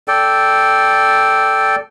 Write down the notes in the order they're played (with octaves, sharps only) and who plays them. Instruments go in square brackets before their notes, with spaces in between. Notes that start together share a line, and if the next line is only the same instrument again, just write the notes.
[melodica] A4 D5 G5